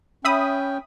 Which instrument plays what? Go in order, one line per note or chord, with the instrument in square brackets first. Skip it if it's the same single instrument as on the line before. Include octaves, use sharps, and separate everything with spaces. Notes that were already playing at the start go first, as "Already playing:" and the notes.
[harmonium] C#4 G5 [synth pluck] E5 B5 D#6